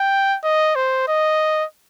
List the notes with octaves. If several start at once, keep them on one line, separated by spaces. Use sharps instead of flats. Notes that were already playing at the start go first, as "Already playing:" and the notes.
Already playing: G5
D#5
C5
D#5